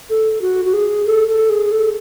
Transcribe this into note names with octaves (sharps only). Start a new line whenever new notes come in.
A4
F#4
F#4
G#4
A4
A4
G#4
A4